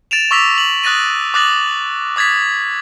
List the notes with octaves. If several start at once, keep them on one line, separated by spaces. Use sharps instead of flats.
A6 D7 E7 F7
C#6 D6 E6 A#6 B6 F7
F#7
D#6 F#6 A6 A#6 D#7
D6 D#6 F#6 A6 A#6 F#7
D6 D#6 G#6 A6 B6